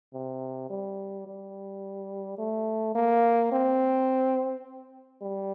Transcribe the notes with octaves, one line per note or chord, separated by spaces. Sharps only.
C3
G3
G3
A3
A#3
C4
G3